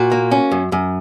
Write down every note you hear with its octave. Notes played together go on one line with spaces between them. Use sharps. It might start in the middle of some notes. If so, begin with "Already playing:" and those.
Already playing: A#2 F#4
A#3
C#4
F#2
F#2